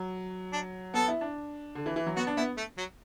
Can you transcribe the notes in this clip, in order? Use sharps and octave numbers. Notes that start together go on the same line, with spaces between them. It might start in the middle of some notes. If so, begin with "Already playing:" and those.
Already playing: F#3
D4
B3 A4
E4
D4
D3
E3
E3
F#3
B3 F#4
D4
B3 E4
A3
F#3